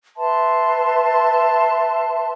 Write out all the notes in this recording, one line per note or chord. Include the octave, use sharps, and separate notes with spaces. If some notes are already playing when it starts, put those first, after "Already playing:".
B4 E5 A5 C6